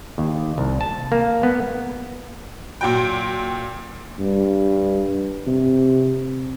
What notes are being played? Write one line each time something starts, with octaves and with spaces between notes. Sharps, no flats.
D#2
C2
A5
A#3
B3
A#2 F#3 G5
G2
C3